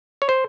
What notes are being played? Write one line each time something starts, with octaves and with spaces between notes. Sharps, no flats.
C#5
C5